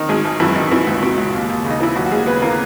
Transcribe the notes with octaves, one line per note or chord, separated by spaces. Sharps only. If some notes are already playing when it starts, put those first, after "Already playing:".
Already playing: D#3
G#1 G#3 G#4
G#1
F#2 E3 E4
D#3
B2 E3 E4
C#2
B2
C#2
D#2
D#2
C#3
D#4
E3 E4
D#2 F#3 F#4
F#4
D#2 G#3 G#4
C#3 B3 B4
E3 A#3 A#4